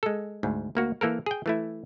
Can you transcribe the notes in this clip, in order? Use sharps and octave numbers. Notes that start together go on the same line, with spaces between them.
G#3 A4
D2 G#2
D2 A#3 F#4
E3 A#3 A4 A#4
G#4 G5
E3 A3 E4